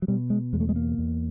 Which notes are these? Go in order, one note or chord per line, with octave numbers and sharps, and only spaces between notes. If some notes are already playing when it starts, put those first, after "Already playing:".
F#3
B2 G3
G#3
E2 G#3
A3
G#3
A#3
E2